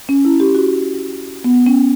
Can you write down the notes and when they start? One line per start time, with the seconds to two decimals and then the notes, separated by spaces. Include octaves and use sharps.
0.09 C#4
0.25 E4
0.40 G4
0.55 F#4
1.44 B3
1.66 C#4